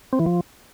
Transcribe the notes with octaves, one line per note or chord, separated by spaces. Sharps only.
C4
E3
F3